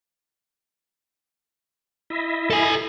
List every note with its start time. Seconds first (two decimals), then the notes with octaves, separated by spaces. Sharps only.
2.10 E4 D#5 E5
2.50 A4 G#5